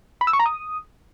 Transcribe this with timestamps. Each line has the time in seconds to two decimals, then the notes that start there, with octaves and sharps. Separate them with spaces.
0.21 B5
0.27 E6
0.33 C#6
0.40 A#5
0.46 D#6